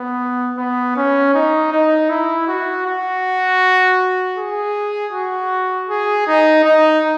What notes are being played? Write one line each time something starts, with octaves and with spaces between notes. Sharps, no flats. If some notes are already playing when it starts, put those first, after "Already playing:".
Already playing: B3
B3
C#4
D#4
D#4
E4
F#4
F#4
G#4
F#4
G#4
D#4
D#4